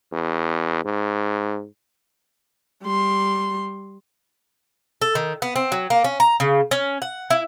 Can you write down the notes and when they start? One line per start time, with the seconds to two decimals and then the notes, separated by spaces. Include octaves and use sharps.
0.12 E2
0.85 G#2
2.83 G3 C6
5.02 A4
5.15 D#3
5.42 B3
5.56 C4
5.72 F#3
5.90 A#3
6.04 C#4
6.20 A#5
6.40 C#3
6.71 C#4
7.02 F#5
7.31 E4